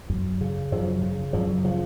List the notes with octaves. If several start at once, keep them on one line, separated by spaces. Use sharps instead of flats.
F#2
C#3
F#2 F3
C#3
F#2 F3
C#3 F3